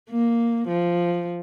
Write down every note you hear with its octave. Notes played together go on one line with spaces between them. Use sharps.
A#3
F3